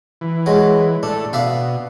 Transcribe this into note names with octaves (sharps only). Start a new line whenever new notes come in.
E3
F#3 G#3
A2 D4 A4
B2 D4 E5 F5